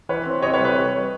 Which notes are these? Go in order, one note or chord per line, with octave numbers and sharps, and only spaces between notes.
E3 B4 C#5
C4
C3 C#5 D#5
B4 C#5
G3
B4 C#5